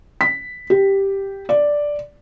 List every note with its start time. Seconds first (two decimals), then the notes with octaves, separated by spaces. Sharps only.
0.21 B6
0.70 G4
1.49 D5